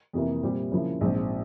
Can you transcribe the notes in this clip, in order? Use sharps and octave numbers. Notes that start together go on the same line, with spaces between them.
F2 C3 E3 A#3
A#2 G3 C4 G4
C#3 F3 A#3 E4
A#1 G#2 F3 C4